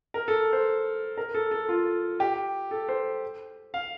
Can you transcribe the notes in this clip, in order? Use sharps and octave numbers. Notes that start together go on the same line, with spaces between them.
A#4
A4
C5
A#4
A4
A4
F4
G4
A4
C5
F5